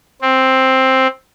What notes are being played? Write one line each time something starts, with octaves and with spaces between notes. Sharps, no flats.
C4